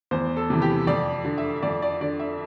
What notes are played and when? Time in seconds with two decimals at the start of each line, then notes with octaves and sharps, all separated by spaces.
0.11 E2 C5
0.37 A4
0.50 C3 E3
0.62 G4
0.87 F2 D5
1.25 D3
1.38 E5
1.63 F2 D5
1.82 D5
2.01 D3 D5
2.20 E5